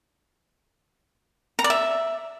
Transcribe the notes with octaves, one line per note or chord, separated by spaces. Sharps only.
A#5
D5
E5